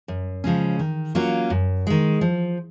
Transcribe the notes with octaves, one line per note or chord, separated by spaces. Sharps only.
F#2
C#3 F3 G#3 C#4
D#3
F#3 A#3 C#4 F4
F#2
D#3 G#3
F3